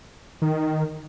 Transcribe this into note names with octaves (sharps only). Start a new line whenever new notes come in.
D#3